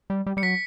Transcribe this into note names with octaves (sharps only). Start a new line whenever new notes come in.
G3
G3
G3 C#7
F#3 B6